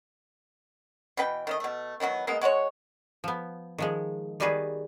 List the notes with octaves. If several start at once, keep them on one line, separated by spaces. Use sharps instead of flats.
B2 E3 B4 G5
D#3 A3 D#5
B2 A3
D#3 E3 F#3 B3
G#3 A#3 B3 D#4
G#3 F#4 B4 C#5
F3 B3
D#3 F3 G#3
D#3 G3 B3 F#4 G#4 B4